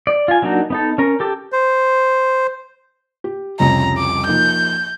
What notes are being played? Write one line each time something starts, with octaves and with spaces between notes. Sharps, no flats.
D5
F4 G#5
F#3 A#3 D4 D#4 F#4
B3 D#4 A4
C#4 A#4
G4 A4 D6
C5
G4
C2 F2 C#3 A#5
D6
F3 A#3 D#4 G6